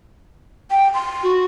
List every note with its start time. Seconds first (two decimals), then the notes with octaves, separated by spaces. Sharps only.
0.71 G5
0.94 C6
1.23 F#4